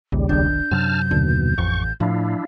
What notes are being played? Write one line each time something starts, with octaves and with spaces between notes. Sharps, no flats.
A#1 D#2 C#3 G3
F1 B1 D#3 D4 G6
F#2 C3 F#3 A5 F6
D#2 B2 D3
A1 F2 C#6
A2 F3 D4 E4 F5